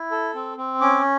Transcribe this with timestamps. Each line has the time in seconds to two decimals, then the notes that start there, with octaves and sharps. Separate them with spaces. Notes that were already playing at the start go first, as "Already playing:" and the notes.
Already playing: E4
0.11 A4
0.35 C4
0.58 C4
0.81 C#4 D6